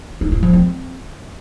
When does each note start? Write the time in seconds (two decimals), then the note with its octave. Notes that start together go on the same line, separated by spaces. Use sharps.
0.21 D#4
0.32 E4
0.43 F3
0.53 C4